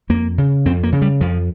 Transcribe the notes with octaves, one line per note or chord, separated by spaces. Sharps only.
F2 A#3
C#3
F2 C4
A#3
C#3
G3
F2 F3